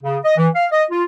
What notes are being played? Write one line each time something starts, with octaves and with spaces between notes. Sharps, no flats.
C#3
D#5
E3
F5
D#5
F4